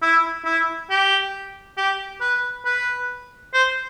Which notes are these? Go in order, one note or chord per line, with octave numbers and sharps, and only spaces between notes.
E4
E4
G4
G4
B4
B4
C5